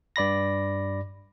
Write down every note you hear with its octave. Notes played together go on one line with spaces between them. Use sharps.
G2 D5 B5 A#6